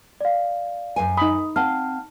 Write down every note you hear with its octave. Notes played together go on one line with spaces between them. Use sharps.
D5 F5
F#2 C5 G#5
D#4 B5 D#6
C4 F5 F#5 A5 F6